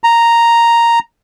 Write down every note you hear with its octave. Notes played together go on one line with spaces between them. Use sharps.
A#5